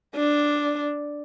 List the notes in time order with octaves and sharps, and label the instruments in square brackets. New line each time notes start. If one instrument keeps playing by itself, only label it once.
[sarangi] D4